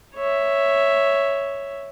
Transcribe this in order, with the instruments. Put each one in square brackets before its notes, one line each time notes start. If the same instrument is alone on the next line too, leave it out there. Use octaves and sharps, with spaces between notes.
[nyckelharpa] C#5 E5